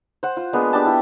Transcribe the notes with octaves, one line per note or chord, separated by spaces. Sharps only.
C5 F#5
F4
G#3 A#3 B3 D4
D4 G4 A5
E4 G5